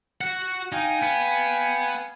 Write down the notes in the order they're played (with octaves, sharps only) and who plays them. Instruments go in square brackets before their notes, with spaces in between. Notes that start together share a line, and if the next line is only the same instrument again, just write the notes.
[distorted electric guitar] F#4 F#5
[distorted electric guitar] D#4 [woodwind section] F5 G5 G#5
[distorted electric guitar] B3